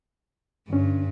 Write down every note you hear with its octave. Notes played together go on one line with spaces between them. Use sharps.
G2 D3 C#4